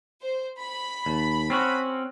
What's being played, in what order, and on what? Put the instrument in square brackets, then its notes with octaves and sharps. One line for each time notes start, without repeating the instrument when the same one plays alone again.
[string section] C5
B5
[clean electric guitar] D#2
C4 C#4 F#4